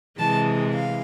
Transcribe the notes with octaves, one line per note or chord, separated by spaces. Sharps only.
C3 E3 G#3 A5
F5